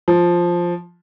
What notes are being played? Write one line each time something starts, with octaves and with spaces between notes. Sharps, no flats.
F3